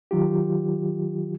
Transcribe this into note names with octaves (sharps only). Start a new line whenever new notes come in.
D#3 F#3 F4 G4